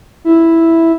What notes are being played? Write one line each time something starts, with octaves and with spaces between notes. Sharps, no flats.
E4